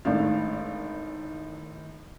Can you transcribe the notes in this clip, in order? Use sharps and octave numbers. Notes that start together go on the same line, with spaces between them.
G#1 A2 D#3 D4 F5